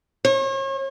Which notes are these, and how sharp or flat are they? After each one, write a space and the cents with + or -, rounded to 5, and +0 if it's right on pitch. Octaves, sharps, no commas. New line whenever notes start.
C#5 -40